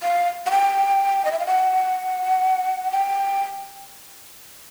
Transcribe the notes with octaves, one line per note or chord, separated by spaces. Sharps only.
F5
F#5
G5
D#5
E5
F5
F#5
G5